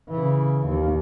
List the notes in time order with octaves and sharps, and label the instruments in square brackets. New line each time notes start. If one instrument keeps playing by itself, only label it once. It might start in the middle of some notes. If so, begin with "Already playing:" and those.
[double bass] C#3 E3
D#2